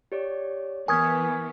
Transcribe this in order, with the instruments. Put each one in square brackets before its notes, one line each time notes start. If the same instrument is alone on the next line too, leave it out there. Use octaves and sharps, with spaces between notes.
[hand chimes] G4 C#5 D5
[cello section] E3 B3 [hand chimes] A#4 C#6 F6 [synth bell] G#5 D#6 G#6